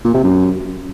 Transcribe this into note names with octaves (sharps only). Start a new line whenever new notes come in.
A#2
C3
F#2